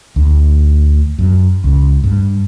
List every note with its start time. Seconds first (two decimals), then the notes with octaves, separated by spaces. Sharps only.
0.16 D2
1.19 F#2
1.64 C#2
2.04 G2